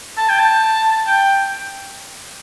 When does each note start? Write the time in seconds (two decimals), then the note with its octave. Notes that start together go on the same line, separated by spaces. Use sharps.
0.17 A5
0.29 G5
0.39 A5
1.07 G5